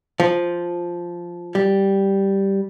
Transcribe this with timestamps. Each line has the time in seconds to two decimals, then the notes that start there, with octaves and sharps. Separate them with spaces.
0.20 F3
1.55 G3